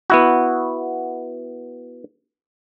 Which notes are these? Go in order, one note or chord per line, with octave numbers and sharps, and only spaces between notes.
B3 E4 F#4